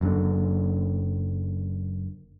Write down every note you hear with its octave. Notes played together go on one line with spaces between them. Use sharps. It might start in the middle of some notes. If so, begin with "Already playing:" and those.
F#1 F#2 A#2 D3